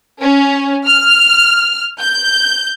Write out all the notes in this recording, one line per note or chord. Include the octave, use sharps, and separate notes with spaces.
C#4
F6
G6